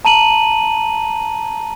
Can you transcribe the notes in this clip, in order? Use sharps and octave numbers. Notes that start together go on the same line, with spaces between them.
A5 A#5 D#7 F#7